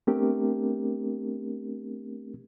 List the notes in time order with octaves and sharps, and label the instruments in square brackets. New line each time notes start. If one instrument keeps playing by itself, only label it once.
[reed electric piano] A3 B3 C4 D4 G4 A#4